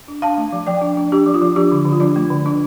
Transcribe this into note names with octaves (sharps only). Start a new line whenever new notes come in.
D4
D4 F5 A5
A3
F3
F3 D5 G5
D4
D4
D4 G4
F3
F4
F3
F3 D4 G4
D3
D3
F4
F3 D4
A3
D3
D4